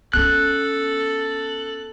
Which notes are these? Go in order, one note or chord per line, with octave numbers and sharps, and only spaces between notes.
B3 C#4 A4 F#6